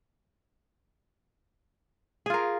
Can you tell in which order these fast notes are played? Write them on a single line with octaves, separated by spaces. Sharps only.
G#4 F4 A#4